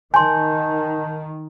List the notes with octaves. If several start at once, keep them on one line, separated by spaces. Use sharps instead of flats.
D#3 G#5 A5 C6 G6